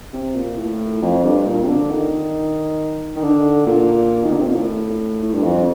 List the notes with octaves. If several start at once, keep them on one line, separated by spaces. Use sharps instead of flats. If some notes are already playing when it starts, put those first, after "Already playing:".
C3
A#2
A2
F2
G2
A#2
C3
D3
D#3
D#3
D3
A#2
D#3
D3
C3
A#2
A2
A2
G2
F2